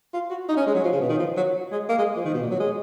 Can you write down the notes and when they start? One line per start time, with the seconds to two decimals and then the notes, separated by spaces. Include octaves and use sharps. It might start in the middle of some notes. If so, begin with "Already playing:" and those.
0.13 F4
0.30 F#4
0.48 D#4
0.57 C#4
0.66 G#3
0.75 F#3
0.84 F3
0.92 C#3
1.01 B2
1.09 D#3
1.19 F3
1.37 F#3
1.72 G#3
1.89 A#3
1.98 G#3
2.16 F3
2.25 D#3
2.34 B2
2.43 A#2
2.51 F#3
2.60 G#3